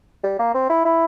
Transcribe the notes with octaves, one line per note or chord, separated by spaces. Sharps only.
G3
A#3
C4
E4
E4